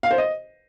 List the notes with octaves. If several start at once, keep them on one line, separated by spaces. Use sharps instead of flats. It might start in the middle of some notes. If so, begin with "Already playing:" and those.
F5
C5
D#5